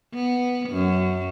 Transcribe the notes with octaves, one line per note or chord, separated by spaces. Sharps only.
B3
F#2